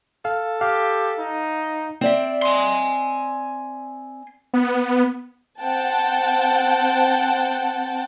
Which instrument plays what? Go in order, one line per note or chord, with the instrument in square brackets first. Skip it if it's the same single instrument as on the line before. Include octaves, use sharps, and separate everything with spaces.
[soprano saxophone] A4 [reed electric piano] F5
[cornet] G4 [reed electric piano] F5
[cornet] D#4
[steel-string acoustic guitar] C4 D5 E5
[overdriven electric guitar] G#5 C6
[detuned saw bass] B3
[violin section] C4 F#5 G5 A5